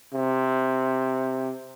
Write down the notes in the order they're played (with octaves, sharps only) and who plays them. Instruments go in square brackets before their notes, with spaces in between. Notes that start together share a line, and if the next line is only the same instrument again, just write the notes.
[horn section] C3